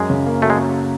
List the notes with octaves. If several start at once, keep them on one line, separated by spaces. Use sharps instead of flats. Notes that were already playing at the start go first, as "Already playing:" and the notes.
Already playing: F#2 G#3
C#3
A#3
F#3 A3
G#3